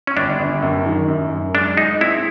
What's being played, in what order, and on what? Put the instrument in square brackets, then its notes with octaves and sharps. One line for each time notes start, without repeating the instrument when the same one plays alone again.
[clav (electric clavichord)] C#4
[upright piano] G1 [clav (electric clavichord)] D4
[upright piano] G1
F#2
D#3
F#2
F#2
[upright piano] G#3 [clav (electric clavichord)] D4
[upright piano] G#3 [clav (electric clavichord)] D#4
[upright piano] C4 [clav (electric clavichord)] E4